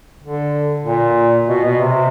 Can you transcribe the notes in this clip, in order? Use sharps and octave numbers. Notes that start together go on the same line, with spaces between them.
D3
A#2
B2
B2
C3